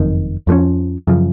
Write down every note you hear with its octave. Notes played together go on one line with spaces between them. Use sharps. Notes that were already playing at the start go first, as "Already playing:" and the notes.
Already playing: F#1 F2 D#3
F2 F3 G#3 C#4
F#2 C#3 F3